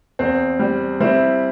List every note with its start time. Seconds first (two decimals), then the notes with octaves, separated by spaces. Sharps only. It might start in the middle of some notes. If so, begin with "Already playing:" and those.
0.19 E2 C4
0.59 G3
1.01 G3 C4 E4